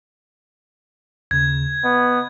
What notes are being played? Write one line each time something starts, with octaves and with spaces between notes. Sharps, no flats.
D#2 C#3 G#6
B3 D#5